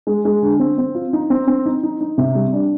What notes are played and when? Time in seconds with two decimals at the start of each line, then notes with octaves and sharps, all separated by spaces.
0.07 G#3
0.25 G#3
0.42 D3
0.60 C4
0.78 C4
0.95 F4
1.13 D#4
1.30 C4
1.47 C4
1.66 D#4
1.83 D#4
2.01 D#4
2.18 C3
2.35 G3
2.53 D4